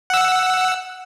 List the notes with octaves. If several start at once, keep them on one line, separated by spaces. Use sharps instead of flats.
F#5 E6